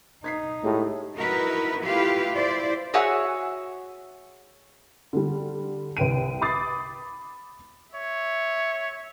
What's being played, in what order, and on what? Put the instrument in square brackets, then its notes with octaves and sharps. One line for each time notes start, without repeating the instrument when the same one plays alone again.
[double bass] D#4 [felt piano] G#6 B6 C7
[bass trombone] A2 [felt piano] G#3 G4 G#4
[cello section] D#4 E4 F#4 A#4 B4
A3 E4 F4 G4 B4 F5
E4 C5 D5
[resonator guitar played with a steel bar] F#4 G#4 C#5 E5 F#5 G#5
[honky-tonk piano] D3 G3
C2 B4 G5 D7 D#7
B5 D6 D#6 A6 C7
[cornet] C#5 [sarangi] E5